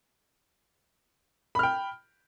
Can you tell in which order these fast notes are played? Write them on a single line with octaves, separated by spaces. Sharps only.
B5 F6 G5